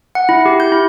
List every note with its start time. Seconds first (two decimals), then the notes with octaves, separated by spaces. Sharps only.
0.15 F#5
0.29 E4
0.46 G4
0.60 G6
0.72 E4